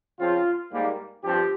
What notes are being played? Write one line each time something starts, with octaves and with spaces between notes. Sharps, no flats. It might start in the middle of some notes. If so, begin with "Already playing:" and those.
C#3 F3 C4 F4
G#2 G3 A#3
G2 F3 C4 G4